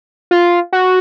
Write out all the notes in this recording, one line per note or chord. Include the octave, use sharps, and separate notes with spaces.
F4
F#4